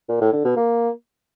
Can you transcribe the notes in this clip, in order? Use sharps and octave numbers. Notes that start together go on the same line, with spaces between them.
A#2
A2
D3
B2
A#3